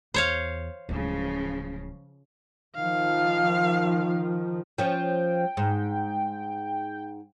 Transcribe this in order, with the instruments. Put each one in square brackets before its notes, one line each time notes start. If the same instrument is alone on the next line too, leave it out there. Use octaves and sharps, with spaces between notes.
[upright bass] E2 [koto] C5 C#5 F5
[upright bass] D1 G#3 [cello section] C#3 F3
[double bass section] D#3 F3 [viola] F5
[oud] F3 C#4 [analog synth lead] G5
[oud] G#2